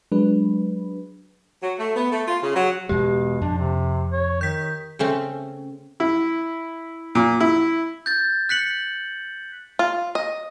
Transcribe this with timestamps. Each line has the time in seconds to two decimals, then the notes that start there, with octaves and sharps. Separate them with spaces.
0.12 F#3 G#3 D4 B4
1.62 F#3
1.79 A3
1.96 B3
2.12 A3
2.27 F4
2.42 C#3
2.55 F#3
2.89 E2 B2 G#3 G4
3.41 F2 D4
3.57 C3
4.12 C#5
4.41 D#3 G6 B6
4.99 C#3 A3 C4 C#4
6.00 E4
7.15 A#2
7.40 E4
8.06 G6 A6
8.49 F#6 B6 C#7 F#7
9.79 F4
10.15 D#5